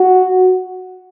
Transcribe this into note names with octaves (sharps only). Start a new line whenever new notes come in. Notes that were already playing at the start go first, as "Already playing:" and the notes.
Already playing: F#4